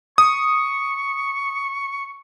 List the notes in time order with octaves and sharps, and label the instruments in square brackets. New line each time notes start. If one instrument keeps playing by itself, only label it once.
[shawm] C#6 [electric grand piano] D#6